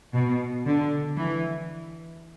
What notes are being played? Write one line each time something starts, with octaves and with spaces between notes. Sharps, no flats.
B2
D3
E3